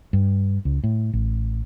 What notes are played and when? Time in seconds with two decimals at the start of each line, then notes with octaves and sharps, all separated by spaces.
0.13 G2
0.65 C#2
0.84 A2
1.13 A1